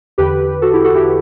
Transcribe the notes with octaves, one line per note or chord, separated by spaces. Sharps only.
E2 D3 G4 B4
F#4 A4
E4 G4
F#4 A4
E4 G4